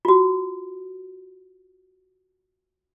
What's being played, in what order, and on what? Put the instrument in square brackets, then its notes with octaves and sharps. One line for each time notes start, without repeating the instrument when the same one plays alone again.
[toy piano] F4 F#4